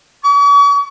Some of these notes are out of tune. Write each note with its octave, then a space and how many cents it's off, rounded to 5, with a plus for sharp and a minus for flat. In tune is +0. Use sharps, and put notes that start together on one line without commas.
C#6 +45